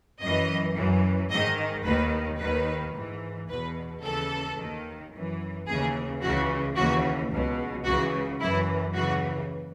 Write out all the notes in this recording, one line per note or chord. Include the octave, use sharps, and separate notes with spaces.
F#2 E3 D#5
F#2 E3
G#2 D#3 D#5
D#2 D#3 B4
D#2 D#3 B4
G#2 E3
E2 B2 B4
D#2 C#3 E3 A4
D#2 D#3
F#2 E3
D#2 C#3 E3 G#4
C#2 C#3 E3 F#4
D#2 C#3 E3 F#4
C#2 B2
C#2 C#3 E3 F#4
F#2 E3 E4
D#2 C#3 E3 F#4